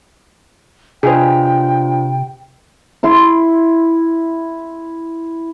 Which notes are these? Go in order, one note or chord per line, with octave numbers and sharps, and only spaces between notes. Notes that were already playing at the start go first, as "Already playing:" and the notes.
C3 D4 F4 G#4 B4 C5 G5
E4 C6